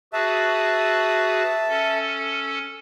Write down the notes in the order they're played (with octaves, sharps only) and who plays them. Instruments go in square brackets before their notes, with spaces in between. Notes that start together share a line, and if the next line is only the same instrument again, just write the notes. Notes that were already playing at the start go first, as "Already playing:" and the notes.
[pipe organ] F#4 G#4 B4 [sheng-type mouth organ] E5 A5
[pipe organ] C#4 A4